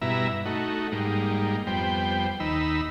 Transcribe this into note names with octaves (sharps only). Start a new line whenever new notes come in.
G2 B2 E4 E5 A#5
A3 D#4 F#4
G#2 G3 A#3 D#4
F2 G3 B3 C5 G5
D#2 D#4 B5 E6